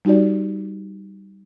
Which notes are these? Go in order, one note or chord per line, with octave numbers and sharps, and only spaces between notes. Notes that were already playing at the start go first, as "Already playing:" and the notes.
G3 D#4 F#4 G4 D5